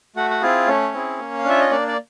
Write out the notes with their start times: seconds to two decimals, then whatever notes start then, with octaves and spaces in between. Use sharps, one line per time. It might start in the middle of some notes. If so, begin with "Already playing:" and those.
0.16 A3 F#4 F#5
0.30 F#5
0.41 C4 E4 F4 G#4 F5
0.67 A3 C#4 C#5
0.94 C4 E4 G#4
1.19 A#3
1.38 F5
1.45 D4 F4 E5
1.60 D#5
1.71 A#3 D4 D5
1.87 D5